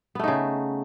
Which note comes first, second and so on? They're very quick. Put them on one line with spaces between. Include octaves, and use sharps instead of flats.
B3 A3 D#4 C#3